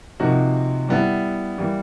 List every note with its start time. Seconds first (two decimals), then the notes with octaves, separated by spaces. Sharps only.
0.20 C3 F3 A#3 D#4 F#4
0.89 G3 B3 E4
1.58 E3 G3 A#3